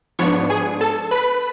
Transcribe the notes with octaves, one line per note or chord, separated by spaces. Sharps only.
G#2 F3 B3 D4 C#5 C#6
G#4 G#5
A4 A5
B4 B5